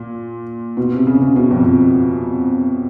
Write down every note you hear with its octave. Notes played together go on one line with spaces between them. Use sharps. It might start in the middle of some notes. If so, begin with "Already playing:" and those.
Already playing: A#2
B2
C3
C#3
C#3
B2
F2